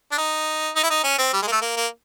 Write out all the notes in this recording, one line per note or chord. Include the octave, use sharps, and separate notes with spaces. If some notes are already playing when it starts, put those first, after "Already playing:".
D4
D#4
D#4
E4
D#4
C#4
C4
G3
G#3
A#3
A3
A#3
A#3